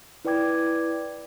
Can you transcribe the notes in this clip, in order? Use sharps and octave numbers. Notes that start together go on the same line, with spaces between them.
E4 B4 D5 G5 D6 G#6